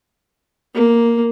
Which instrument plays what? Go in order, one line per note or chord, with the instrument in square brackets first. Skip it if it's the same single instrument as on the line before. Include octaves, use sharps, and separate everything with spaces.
[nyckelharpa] A#3